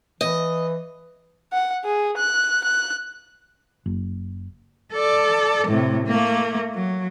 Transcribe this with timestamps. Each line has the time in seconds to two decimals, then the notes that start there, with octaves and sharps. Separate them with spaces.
0.21 E3 D#5
1.53 F#5
1.85 G#4
2.18 F#6
2.64 F#6
3.86 F#1
4.93 A4 D5
5.67 A2 C3
6.07 A3 A#3
6.75 F#3